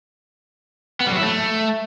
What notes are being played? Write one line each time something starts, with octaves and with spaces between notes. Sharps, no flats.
B3
G3
F#3
E4
A3